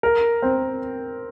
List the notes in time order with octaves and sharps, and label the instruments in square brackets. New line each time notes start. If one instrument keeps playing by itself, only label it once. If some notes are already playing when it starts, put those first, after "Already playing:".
[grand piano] A#4
C4